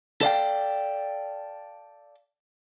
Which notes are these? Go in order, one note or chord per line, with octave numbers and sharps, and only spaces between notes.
A4 D5 F5 G5